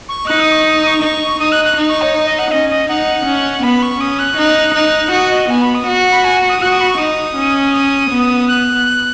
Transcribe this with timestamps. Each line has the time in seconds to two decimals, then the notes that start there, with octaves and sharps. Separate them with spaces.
0.09 C#6
0.27 D#4 F#6
0.40 D#6
0.52 C#6
0.83 D#6
0.87 C#6
1.02 D#4
1.40 D#4 D#6
1.52 F#6
1.65 F#6
1.77 D#4
1.89 C#6
2.02 C#5
2.26 D#5
2.39 F#5
2.51 C#4 D#5
2.70 D#5
2.88 D#4 F#5
3.26 C#4
3.63 B3 B5
3.82 C#6
4.01 C#4 D#6
4.19 F#6
4.38 D#4
4.75 D#4
5.12 F#4 D#6
5.31 D#5
5.50 B3 G#5
5.62 B5
5.75 D#6
5.87 F#4
6.12 B5
6.24 G#5
6.49 D#6
6.61 F#4 F#6
6.71 D#6
6.80 B5
6.89 C#6
6.98 D#4 D#6
7.36 C#4
7.73 D#6
8.10 B3
8.48 F#6